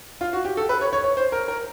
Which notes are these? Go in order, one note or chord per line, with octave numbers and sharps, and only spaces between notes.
F4
F#4
G4
A4
B4
C#5
C#5
C#5
C5
A#4
A#4